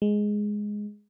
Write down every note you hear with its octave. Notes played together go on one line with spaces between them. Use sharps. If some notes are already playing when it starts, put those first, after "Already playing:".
G#3